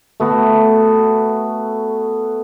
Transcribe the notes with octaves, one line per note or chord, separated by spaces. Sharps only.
A3 B3 F#4